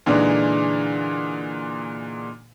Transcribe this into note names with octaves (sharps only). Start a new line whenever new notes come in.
A#2 D3 E3 G#3 D4 D#4